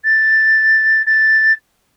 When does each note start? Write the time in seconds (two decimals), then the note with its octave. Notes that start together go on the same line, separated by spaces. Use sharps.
0.04 A6
1.06 A6